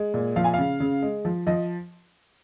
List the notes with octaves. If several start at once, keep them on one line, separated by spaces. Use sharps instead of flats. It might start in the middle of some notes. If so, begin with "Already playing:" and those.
Already playing: G#3
A#2
F3 F5
G#5
C#3 F5
C#3
G#3
F3
F3 D#5